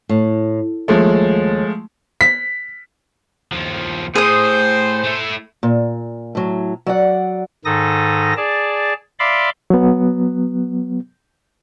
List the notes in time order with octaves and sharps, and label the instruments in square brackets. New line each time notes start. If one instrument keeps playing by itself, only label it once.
[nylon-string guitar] A2
[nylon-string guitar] D#2 [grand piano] F3 G#3 A3
[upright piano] B6
[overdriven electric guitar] D#2 F3
[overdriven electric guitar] A2 [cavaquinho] G#4 D#6 [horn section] C5
[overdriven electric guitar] A3 E4
[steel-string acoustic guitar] A#2
A2 F#3
F#3 D5 F#5
[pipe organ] G#2 D#3 D#4 A4 D#6 A#6
G#4 D5 A5
D5 E5 F5 B5 C6 D6
[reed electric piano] F#3 B3